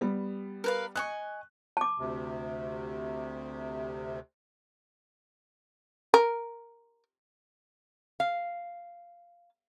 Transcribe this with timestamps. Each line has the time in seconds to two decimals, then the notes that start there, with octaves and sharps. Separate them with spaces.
0.01 G3 B3
0.64 A#4 B4 F5
0.96 D#5 G#5 C#6 F#6
1.77 A5 D6
1.99 D2 C3
6.14 A#4
8.20 F5